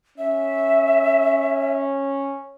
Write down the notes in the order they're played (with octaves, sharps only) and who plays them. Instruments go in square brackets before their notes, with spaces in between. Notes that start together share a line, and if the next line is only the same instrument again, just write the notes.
[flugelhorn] C#4 [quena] E5